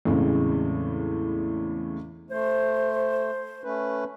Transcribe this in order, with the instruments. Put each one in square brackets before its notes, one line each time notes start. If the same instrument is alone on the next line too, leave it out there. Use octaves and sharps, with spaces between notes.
[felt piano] E2 A2 C#3 G#3 C4
[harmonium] A3 [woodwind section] C5
[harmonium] A3 C#4 B4